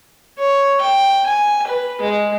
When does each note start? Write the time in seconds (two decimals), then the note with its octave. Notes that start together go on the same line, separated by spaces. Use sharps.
0.38 C#5
0.81 G5
1.26 G#5
1.67 B4
2.01 G#3